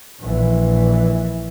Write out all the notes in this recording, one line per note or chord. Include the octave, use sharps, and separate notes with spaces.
A#1 E3